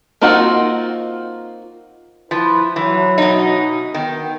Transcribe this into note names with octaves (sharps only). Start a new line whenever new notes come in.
A#3 C4 D#4 F4 F#4
F3 E4 B4
E3 F#3
B2 D#4
D#3 B3 G5